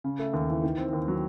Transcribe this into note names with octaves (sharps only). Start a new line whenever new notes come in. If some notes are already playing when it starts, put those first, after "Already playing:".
C#3
A3
D#2
E3
D#3
C4
D#2
F#3